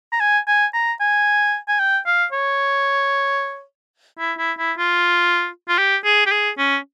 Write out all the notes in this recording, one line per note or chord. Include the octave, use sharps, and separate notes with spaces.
A#5
G#5
G#5
A#5
G#5
G#5
G5
F5
C#5
E4
E4
E4
F4
F4
G4
G#4
G4
G#4
C#4